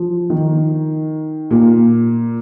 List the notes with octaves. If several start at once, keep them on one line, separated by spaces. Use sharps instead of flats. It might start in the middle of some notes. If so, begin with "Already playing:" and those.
Already playing: F3
D#3
A#2